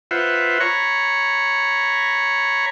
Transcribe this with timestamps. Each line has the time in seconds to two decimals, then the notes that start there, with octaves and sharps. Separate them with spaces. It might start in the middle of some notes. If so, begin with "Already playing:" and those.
0.11 F4 B4 C5 E5 F#5
0.60 C#5 A#5 B5 C#6